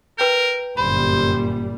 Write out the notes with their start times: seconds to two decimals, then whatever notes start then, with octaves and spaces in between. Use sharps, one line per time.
0.18 A#4 B4 G5 G6
0.77 G1 F#2 A#2 G3 C5 B5